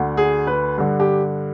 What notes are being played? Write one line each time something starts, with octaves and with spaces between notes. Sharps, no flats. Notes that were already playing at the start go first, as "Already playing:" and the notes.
Already playing: D2 D3
G#4
B4
G2 D3
G4